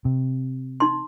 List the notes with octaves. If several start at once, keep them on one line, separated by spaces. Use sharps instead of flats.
C3
D#4 C6